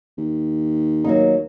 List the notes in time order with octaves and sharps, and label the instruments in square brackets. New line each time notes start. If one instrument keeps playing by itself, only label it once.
[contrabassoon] D#2
[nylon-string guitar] F#3 A#3 D#4